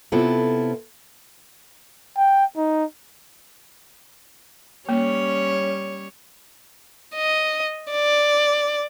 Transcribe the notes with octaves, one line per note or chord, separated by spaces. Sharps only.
C3 B3 C4 E4 F4 A4
G5
D#4
G3 A#3 C#4 C#5
D#5
D5